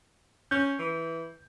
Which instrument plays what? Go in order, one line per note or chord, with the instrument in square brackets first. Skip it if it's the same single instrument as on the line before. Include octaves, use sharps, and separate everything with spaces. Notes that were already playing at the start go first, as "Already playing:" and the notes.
[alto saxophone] C#4 [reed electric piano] G6
[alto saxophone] E3